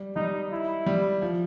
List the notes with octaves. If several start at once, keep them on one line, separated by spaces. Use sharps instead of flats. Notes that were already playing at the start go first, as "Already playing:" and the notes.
Already playing: G3
G3 D#4
E4
G3
F3